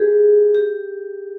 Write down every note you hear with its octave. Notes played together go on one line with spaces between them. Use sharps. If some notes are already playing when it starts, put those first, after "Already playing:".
Already playing: G4 G#4
G4